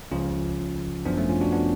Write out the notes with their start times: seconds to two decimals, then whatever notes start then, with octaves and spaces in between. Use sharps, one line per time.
0.11 C#2 C#3 F3 C#4 F4
1.05 G#1 F#2 F3 B3 D4
1.18 A3 C#4
1.29 C#4 F4
1.41 D4 F#4
1.52 B3 D4